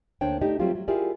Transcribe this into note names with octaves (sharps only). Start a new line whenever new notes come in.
D2 A#3 D4 C5 C#5 G5
A3 D#4 G4 D5
F#3 G3 A3 C4 F4 G4
F#3
E4 F4 G4 G#4 A#4 D5